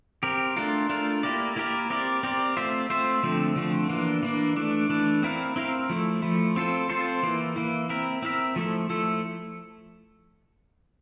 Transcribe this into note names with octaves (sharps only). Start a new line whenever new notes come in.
C4 G4 A#4
A3 D4 F4 A#4
A3 D4 F4 A#4
A#3 E4 G4 A#4 D5
A#3 E4 G4 A#4 D5
C4 G4 A#4 D5
C4 G4 A#4 D5
A3 C4 F4 C5 E5
A3 C4 F4 C5 E5
D3 F3 A3 C4
D3 F3 A3 C4
E3 A#3 D4
E3 A#3 D4
E3 A3 D4
E3 A3 D4
C4 E4 A#4 F5
C4 E4 A#4 F5
F3 A3 E4
F3 A3 E4
C4 F4 A4 C5
C4 F4 A4 C5
E3 A#3 E4
E3 A#3 E4
C4 E4 A#4 E5
C4 E4 A#4 E5
F3 A3 E4 A4
F3 A3 E4 A4